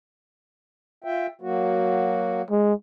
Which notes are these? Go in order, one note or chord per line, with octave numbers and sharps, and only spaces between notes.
F4 E5 G5
F#3 A#3 F#4
G#3